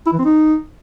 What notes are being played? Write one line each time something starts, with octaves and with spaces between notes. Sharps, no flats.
E4
E3
C4
D#4